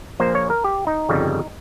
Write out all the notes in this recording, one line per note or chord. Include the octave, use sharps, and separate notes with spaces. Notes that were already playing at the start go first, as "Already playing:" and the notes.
A#1 A#2 F3 A#3 C5
C#5
A#4
G4
D#4
G1 F2 C#3 G3